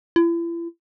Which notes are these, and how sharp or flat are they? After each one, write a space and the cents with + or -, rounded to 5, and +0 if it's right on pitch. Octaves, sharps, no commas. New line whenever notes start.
E4 +40